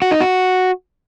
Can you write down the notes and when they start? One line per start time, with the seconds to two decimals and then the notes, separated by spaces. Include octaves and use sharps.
0.02 F#4
0.11 D#4
0.21 F#4